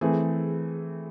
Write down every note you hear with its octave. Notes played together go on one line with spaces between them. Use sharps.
E3 A3 C4 G#4